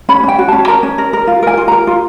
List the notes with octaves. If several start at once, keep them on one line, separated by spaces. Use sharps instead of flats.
C#4 B5
C#4 G5
F#4
C#4 A5
A#4 A#5
C#4
A#4
A#4
F4
A#4 G#5
F4
A#4 A#5
F4